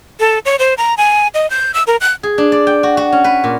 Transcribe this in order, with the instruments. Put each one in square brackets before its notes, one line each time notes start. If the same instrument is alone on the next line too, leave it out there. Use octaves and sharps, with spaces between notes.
[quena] A4
C#5
C5
A#5
G#5
D#5
G6
E6
A#4
F#6
[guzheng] G#4
D4
D5
G5
F#4
F#4
C#4
B4
A#2